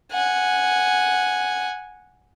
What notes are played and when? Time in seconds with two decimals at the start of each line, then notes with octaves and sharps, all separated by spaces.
0.12 F#5 G#5